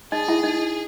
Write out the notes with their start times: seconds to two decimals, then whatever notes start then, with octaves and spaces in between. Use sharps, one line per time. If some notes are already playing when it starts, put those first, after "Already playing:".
0.12 D#4 G#4 D#5
0.28 E4 E5
0.43 D#4 D#5